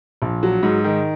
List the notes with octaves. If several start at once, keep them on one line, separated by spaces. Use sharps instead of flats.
A#1
F#3
G#2
D#3